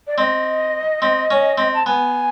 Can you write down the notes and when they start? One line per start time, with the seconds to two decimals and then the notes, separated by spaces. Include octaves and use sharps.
0.07 D5
0.18 C4 D#5
1.02 C4
1.31 C#4
1.58 C4
1.74 A5
1.86 B3 G#5